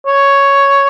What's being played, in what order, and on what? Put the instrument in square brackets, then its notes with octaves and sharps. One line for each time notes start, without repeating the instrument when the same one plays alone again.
[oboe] C#5